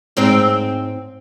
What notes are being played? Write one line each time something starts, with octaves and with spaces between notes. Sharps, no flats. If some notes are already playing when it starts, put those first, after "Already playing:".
G#2 C4 C5